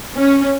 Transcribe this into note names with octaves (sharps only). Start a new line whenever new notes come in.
C#4